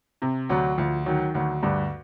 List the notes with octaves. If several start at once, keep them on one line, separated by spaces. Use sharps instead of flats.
C3
D2 F#3
D2 F3
D#3 F#3
D2 F#3
D2 G2 G3